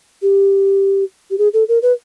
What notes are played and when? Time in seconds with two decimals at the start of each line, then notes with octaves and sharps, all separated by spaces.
0.22 G4
1.31 G4
1.38 G#4
1.54 A4
1.68 A#4
1.82 B4